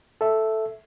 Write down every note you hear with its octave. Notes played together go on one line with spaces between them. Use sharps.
A4 E5